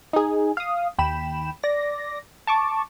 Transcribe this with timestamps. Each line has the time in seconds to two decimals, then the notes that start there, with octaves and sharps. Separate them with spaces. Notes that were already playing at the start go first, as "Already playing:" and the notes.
0.13 D#4 G#4
0.57 F5 D#6
0.98 D#2 G5 B5 E7
1.63 D5 A#6
2.47 A5 C#6 D6